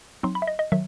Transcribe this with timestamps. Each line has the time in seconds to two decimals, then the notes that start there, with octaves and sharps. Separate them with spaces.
0.23 F#3 C4 D#4 C6
0.35 B5
0.42 E5
0.47 D#5
0.59 D#5
0.72 D#3 F#3 E5